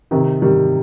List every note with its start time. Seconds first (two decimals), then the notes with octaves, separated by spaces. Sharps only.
0.11 C3 D#3
0.42 D#3 G3